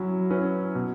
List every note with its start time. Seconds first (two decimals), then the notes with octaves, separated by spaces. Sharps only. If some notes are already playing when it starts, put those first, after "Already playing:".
Already playing: F#3 C#4 E4
0.30 C#4 E4 B4
0.75 B2